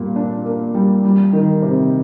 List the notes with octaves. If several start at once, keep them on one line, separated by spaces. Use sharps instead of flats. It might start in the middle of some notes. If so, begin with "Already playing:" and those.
Already playing: A#2 G3
D4
A#3
G3
G3
D#3
C3